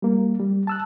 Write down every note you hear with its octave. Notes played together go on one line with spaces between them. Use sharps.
G3 A#3
G3
A5 E6 F#6